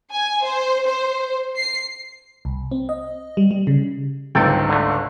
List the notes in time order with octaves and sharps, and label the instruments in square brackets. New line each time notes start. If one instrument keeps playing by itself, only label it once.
[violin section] G#5
C5
C5
C7
[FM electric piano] C2
C4
D#5
G3
G3
C#3
[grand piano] G1 C#2 G#2 [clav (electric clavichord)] A4 G5
[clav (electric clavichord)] D3 A3